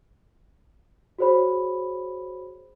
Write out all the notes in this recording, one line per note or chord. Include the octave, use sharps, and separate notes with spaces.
F#4 G#4 C5 C#5 B5